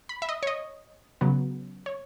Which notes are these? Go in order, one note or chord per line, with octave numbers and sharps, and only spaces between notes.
B5
E5
D#5
C#5
D#5
C#3 F#3 B3
C#5